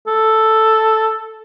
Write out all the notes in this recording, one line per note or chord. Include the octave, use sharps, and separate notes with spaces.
A4